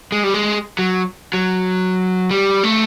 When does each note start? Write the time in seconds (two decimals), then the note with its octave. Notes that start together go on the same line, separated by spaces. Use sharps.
0.12 G#3
0.24 G3
0.34 G#3
0.79 F#3
1.34 F#3
2.31 G3
2.63 A3